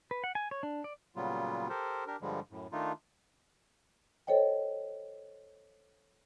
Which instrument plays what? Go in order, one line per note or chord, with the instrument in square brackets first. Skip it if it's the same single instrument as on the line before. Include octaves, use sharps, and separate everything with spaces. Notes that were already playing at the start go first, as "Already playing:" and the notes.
[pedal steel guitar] B4
F#5
G#5
C#5
D4
D5
[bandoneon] A#2 C#3 F#3 G3 B3 F4
G4 A4 A#4 C5
D4 G4 A#4
G2 D3 F3 G3 G#3
F#2 A2
D#3 A3 D4 D#4 F4
[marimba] A4 C5 C#5 D#5 G5